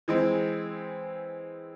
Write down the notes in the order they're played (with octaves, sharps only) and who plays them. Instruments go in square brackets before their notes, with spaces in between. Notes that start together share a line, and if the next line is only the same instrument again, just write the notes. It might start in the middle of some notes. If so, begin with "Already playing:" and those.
[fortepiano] E3 G#3 C4